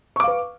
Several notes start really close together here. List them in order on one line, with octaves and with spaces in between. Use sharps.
C#6 D6 F5 B4